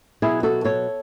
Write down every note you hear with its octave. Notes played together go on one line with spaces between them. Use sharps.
B2 F#3 B3 E4 G#4
F#4 A4
A4 C#5